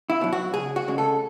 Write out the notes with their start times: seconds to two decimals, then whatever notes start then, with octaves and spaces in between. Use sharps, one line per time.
0.10 E4
0.21 B2 F#3
0.33 F#4
0.54 C#2 G#4
0.76 F#4
0.88 C#3 G#3
0.98 A4